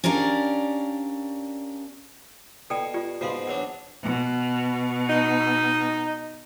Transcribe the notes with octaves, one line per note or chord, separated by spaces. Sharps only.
C#4 D4 G4 A#4 D5 F5
B2 A4 D5 G5
F4 G4 D5
G#2 B2 B3 F#4 F5 C6
E2 F#3 D4 F#5
B2
D#4